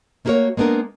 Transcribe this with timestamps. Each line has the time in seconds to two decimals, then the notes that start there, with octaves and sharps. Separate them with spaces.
0.25 A3 A#3 E4 F#4 A#4 C#5
0.57 G#3 A#3 B3 D4 A#4